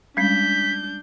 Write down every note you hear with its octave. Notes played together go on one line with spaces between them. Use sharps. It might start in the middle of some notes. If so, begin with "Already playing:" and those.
G3 G#3 C#4 D4 G6 B6